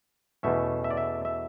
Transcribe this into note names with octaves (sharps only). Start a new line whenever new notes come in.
E2 B2 A3 C#4 E5
E5
D5
E5
E5